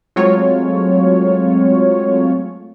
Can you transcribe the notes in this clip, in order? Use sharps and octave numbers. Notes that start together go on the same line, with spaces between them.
F#3 G#3 A3 C4 F4 C#5